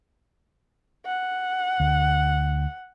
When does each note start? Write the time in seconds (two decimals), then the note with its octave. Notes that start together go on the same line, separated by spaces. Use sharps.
1.06 F#5
1.80 D2